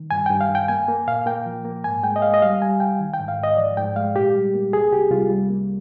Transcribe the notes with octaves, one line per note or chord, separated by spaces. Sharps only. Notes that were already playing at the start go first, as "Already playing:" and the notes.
Already playing: D#3
G2 G#5
G2 G5
F5
G2
G5
A#3 G#5
A#3
A#2 F5
A#3 G5
F3
A#3
G#2 G#5
G#3 G5
D#5
G#3 F5
D#5
G3 F5
G3 G#5
C2 G5
D#3
G5
G#2
F5
G#2 D#5
F3 D5
G#2 G5
G#3 F5
A#2 G4
G3
A#3
C2 G#4
C2 G4
C2 F4
G3
A#3